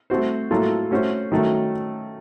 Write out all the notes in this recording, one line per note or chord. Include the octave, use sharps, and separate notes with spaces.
A3 C4 F#4 C5
A2 F#3 A#3 F4 A4
A3 C#4 F#4 C5
D#3 F#3 A3 C#4